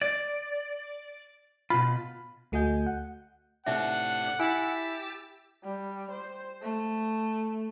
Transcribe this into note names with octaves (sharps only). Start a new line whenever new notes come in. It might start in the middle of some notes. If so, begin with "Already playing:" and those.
D5
B2 F4 B5
D2 A3 F#4 D#5 G#5 G6
F#5
A2 C3 D4 D#4 E5 F#5
E4 G4 G#5 E6 A6
G3
C5
A3